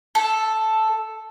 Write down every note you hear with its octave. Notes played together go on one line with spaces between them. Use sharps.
A4